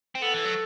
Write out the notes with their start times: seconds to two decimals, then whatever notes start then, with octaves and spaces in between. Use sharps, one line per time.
0.15 C4
0.22 B3 A4
0.34 E3
0.45 F#3